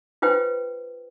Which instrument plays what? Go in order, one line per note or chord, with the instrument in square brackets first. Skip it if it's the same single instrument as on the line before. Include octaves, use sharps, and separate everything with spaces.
[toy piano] F4 B4 C5 G5